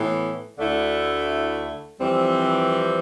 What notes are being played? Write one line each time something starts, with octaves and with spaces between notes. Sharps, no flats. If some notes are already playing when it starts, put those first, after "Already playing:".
Already playing: A2 E3 B3
D2 D3 A3 E4
F2 E3 G3 C4